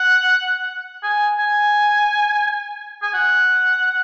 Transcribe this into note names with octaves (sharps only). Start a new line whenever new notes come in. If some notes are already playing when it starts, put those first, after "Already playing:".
Already playing: F#5
G#5
G#5
G#5
F#5